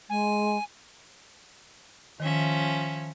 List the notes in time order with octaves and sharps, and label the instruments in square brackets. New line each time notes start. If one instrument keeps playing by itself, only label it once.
[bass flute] G#3 [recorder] G#5
[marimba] D#3 [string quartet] F3 C#4 E5